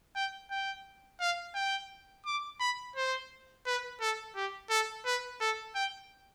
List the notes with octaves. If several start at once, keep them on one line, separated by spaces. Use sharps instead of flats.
G5
G5
F5
G5
D6
B5
C5
B4
A4
G4
A4
B4
A4
G5